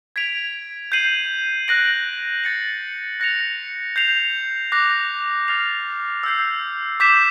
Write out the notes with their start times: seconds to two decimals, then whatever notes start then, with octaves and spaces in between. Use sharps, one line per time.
0.16 G#6 B6 D7 F7
0.92 G6 C7 D#7 F#7
1.68 F#6 A#6 D7 F#7
2.44 A6 C#7 F#7
3.20 F#6 A#6 C#7 F7
3.96 G6 C7 F7
4.72 D6 F#6 A#6
5.48 F6 A6 C7 F7
6.23 E6 G6 C7
7.00 D6 G6 B6 E7